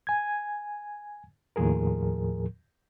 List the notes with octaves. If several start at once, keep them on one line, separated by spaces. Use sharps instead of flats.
G#5 G#6
D#2 A2 F3 G#4 A#4